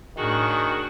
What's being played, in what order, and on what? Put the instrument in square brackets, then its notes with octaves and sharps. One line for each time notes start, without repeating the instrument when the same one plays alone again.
[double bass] A2 [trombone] D#3 [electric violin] D4 F#4 [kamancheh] G#4 C#6